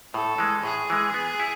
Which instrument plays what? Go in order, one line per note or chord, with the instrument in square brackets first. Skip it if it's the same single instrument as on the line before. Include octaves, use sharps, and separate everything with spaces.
[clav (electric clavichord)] A2 [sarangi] A4
[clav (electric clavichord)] E3 G#3
[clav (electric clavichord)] A2 [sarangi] G#4
[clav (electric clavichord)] E3 G#3
B3
E4